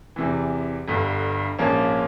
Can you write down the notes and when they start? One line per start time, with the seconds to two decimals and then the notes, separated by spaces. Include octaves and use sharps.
0.16 E2 C3 E3
0.88 G1 G2 D3
1.59 A#1 G#2 F3 A#3 C#4